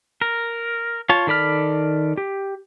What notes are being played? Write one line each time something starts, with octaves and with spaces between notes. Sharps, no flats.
A#4
F4 C#5 A5
D#3 A4 D5 B5 F6
G4